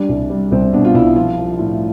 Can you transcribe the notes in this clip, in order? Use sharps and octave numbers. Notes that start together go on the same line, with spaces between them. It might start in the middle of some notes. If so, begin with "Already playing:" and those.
Already playing: G3 D4
C2
G3
C2 C4
B2 D4
F4
C2 E4
F3 F4
F3
A2